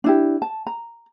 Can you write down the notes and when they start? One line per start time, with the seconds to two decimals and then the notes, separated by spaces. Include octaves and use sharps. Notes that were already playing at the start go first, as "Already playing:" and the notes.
0.04 D4 E4 G4
0.42 A5
0.67 A#5